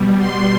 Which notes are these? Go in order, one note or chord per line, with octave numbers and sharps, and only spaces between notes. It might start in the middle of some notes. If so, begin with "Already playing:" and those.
Already playing: B2 G3
C6